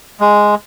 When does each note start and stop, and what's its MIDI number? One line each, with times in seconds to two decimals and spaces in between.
0.21 0.55 56